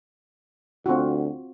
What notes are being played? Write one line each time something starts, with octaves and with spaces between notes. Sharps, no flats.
D2 C4 F4 F#4